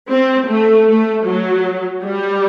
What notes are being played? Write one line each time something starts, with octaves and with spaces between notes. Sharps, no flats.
C4
A3
A3
F#3
G3